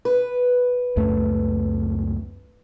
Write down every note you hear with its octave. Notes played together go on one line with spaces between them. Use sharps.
B4
C#2 F#2 A3